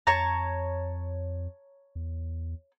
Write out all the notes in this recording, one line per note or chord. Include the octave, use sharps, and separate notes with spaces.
F2 C#5 A5 A#5
E2